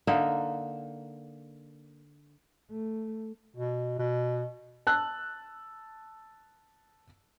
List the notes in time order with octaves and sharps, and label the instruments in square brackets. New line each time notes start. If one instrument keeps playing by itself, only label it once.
[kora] D3 A#3 D#4 E5
[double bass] A3
[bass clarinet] B2
B2
[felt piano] A5 E6 F#6